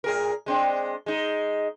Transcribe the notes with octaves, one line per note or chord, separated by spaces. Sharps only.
A2 G#4 A#4
G#3 C4 D4
G#3 D#4